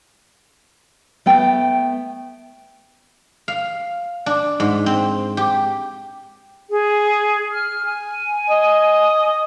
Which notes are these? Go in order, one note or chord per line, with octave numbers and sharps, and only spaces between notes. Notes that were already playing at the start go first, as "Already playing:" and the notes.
A3 B3 G5
F5
D4
G#2
C4
G4
G#4
F6
G#5
D#5